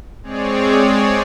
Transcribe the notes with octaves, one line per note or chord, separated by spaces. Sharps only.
G#3 C4 G#4 C#5 D5